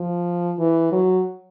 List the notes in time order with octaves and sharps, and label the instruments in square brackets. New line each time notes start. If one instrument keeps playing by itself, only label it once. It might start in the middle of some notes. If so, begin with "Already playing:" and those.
Already playing: [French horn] F3
E3
F#3